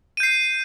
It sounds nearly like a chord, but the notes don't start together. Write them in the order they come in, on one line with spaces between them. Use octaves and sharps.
D#7 G6 C7